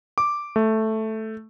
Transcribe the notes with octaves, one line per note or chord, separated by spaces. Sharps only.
D6
A3